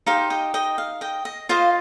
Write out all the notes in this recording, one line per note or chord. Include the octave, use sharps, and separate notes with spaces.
D#4 G4 C5 F5
D#5 G5
D#5 G5
F5
D#5 G5
D#5
F4 C5 D#5 F5